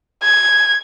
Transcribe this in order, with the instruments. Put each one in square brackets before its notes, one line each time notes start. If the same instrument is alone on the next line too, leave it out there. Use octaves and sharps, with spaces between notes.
[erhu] G#6